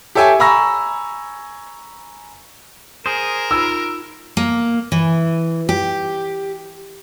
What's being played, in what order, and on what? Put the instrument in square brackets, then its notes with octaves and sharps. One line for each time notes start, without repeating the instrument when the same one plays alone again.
[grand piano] G4 A4 C#5 E5 G5 G#5
G#5 A#5 B5 C#6 E6 A#6
[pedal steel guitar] G#4 C5 [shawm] A#4 [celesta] D#6
[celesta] D#4 F4 B5 [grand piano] E6
[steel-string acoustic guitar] A#3
E3
G4